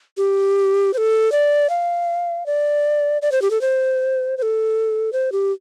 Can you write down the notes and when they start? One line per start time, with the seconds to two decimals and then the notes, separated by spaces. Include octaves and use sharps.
0.17 G4
0.93 C5
0.98 A4
1.32 D5
1.70 F5
2.46 D5
3.22 D5
3.32 C5
3.42 G4
3.51 A4
3.61 C5
4.37 C5
4.42 A4
5.13 C5
5.32 G4